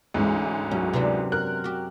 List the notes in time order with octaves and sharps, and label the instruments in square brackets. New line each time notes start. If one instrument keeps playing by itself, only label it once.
[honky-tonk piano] D2 G#2 E3 [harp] G#3 C#4 E4
[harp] F#2 F#3 F#4 [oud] C#4
[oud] C3 B3 D4
[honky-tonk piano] A#4 F#6
[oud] F#4 G4